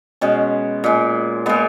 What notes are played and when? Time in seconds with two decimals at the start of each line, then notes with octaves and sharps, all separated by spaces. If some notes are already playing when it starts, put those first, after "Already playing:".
0.21 B2 G#3 C#4
0.84 A#2 G#3
1.46 A#2 G#3 B3